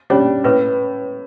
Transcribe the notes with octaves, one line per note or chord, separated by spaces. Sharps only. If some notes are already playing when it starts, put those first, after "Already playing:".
G3 C#4 D4 C#5
A2 B4